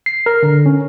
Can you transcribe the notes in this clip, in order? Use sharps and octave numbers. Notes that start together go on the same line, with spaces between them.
C7
A#4
D3
C#4